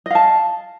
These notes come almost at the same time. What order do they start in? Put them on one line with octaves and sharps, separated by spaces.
D#5 F5 A5